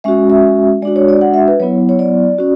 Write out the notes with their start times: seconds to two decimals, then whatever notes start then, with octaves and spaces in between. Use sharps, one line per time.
0.04 G#3 C#4 F#4 E5
0.30 E5
0.82 G#3 D4 F#4 D5
0.96 C#5
1.08 D5
1.21 F#5
1.34 E5
1.48 B4
1.60 F#3 B3 E4 C#5
1.89 C#5
1.99 D5
2.38 C#4 F#4